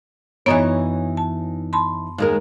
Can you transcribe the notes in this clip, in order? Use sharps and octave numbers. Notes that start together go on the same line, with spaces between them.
F#2 E3 B3 D#4 C#5
A5
A5 B5 C6
D#2 G#3 A#4